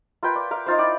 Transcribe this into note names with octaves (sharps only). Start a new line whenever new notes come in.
F4 A#4 B4 G5
D5
A#4 F5
D#4 F4 C5
E4 D5 G5